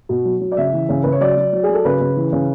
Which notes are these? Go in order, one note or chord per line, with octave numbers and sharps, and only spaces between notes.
B2
F#3
F#3
D5
C#3 E5
E3
C#3
C#3 B4
C#5
F#3 D5
F#3
F#3
G#4
F#3
A4
C#3 B4
C#3
E3
C#3